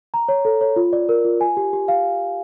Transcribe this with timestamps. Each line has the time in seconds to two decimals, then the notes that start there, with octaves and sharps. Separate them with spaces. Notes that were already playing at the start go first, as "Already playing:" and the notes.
0.14 A#5
0.29 C#5
0.45 A4
0.61 C#5
0.76 F4
0.93 D5
1.09 A#4
1.25 F4
1.41 G#5
1.57 G4
1.73 G4
1.88 F5